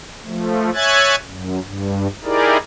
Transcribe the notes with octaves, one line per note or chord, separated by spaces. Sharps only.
F3 A3
C#5 E5 G#5 F#6 G#6 A6
F#2
G2
D#4 E4 G4 G#4 A#4 D5